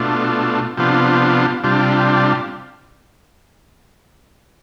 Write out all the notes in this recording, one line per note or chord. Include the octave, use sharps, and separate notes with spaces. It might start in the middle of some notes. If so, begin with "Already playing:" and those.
Already playing: B2 A3 D4 F4
C3 F3 B3 D4 F4
C3 G3 D4 F4